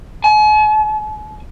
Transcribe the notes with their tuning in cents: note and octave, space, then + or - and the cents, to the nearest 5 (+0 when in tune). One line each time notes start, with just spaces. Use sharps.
G#5 +45